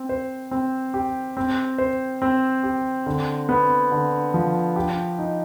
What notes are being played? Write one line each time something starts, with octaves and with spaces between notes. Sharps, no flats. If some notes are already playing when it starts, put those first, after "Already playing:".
Already playing: C4
C5
C4
G4
C4
C5
C4
G4
D3
B3
D3
F3
G4
D#4